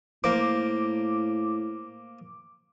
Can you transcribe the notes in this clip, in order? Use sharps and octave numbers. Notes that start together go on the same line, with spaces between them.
A2 A#3 C5 D6